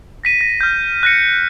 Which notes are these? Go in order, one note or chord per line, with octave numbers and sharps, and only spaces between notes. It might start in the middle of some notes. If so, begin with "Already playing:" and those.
A#6 B6 D#7
A#6
F6 G6
F#6 A#6 C#7